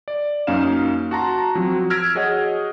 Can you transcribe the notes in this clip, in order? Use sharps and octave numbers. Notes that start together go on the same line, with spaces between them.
D5
F#2 A#3 C#4 D#4 F5 E7
F#4 A5 A#5 C6
F3 F#3 C4 F#4
E6 F6 G#6 A#6 B6 D7
F#4 G#4 C#5 D#5 F#5